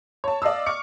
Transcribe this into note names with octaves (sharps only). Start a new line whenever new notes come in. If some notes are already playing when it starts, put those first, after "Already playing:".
C#5 A5
D5 D#5 F5 D#6 E6
C#6 D6 F6 C#7